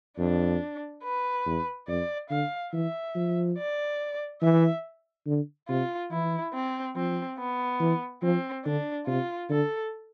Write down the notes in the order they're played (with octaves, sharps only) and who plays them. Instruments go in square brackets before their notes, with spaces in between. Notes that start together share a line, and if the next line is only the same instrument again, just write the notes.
[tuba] F2 [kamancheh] D4
[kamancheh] B4
[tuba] E2
[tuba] F2 [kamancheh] D5
[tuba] D3 [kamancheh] F5
[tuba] E3 [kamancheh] E5
[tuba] F3
[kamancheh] D5
[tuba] E3 [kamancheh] E5
[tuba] D3
[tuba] C3 [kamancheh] F4
[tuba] E3 [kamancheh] E4
[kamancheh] C4
[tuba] F3 [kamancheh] C4
[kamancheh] B3
[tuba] E3
[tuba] F3 [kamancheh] C4
[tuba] D3 [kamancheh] D4
[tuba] C3 [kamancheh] F4
[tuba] D3 [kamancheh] A4